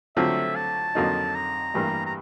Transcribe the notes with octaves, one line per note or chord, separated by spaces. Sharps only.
D3 F#3 A3 C4 F4 E5
A5
F2 D3 F#3 A#3 D#4
A#5
A1 G2 E3 G3 A#3
A#5